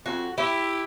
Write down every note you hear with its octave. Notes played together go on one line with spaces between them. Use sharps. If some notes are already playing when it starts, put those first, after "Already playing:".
F2 F#4
E4 G4